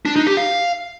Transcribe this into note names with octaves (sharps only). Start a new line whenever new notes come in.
D4
D#4
G4
F5